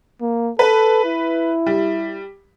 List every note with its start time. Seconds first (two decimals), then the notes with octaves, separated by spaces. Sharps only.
0.22 A#3
0.59 A4 B4
1.05 E4
1.66 G3